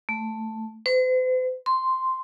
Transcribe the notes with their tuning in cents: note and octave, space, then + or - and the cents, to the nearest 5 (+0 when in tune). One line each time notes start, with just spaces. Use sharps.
A3 +5
C5 -45
C6 -5